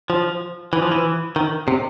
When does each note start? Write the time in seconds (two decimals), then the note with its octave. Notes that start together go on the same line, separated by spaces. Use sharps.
0.10 F3
0.73 E3
0.82 F3
0.91 E3
1.36 D#3
1.68 C3